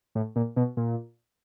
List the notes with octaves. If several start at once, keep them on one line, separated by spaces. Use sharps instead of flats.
A2
A#2
B2
A#2